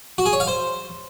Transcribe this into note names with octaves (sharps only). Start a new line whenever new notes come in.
F#4
G#4
C#5
F5
C5